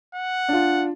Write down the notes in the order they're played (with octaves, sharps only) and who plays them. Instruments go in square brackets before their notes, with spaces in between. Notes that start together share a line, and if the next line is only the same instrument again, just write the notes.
[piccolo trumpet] F#5
[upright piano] D4 F4